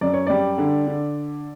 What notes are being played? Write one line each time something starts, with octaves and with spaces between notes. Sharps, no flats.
F#2 D5
C#5
G3 D5
D3
D3